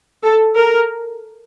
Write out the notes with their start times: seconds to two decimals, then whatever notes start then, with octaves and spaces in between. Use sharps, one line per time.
0.23 A4
0.56 A#4